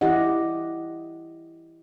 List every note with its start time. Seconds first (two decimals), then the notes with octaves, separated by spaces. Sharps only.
0.01 E3 E4 G4 D#5 F#5